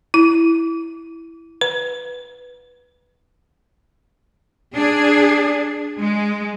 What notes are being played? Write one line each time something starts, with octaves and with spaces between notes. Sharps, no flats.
E4
B4
D4 G#4
G#3